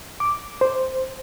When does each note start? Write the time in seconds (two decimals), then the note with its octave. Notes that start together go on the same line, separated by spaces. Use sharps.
0.20 D6
0.61 C5